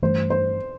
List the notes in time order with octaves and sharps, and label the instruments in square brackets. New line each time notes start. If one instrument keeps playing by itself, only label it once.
[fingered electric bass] G2 E3 A3 [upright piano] C5
[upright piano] C5